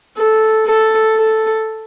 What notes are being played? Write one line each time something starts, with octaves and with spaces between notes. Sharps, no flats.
A4
A4
A4